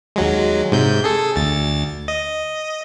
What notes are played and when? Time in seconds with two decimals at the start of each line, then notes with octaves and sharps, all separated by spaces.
0.16 D#2 F#3 G#3
0.72 G#2 C3 G6
1.04 G#4 A4
1.36 D2 A6
2.08 D#5